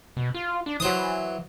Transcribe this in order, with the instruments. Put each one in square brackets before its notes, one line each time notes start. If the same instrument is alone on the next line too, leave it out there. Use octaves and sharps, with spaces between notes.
[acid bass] B2
F4
D4
[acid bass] E3 [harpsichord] F#3 C5 D#6